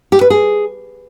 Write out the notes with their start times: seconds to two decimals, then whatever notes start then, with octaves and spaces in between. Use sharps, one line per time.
0.12 G4
0.21 B4
0.30 G#4